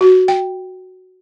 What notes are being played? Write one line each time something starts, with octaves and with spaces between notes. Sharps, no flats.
F#4
G5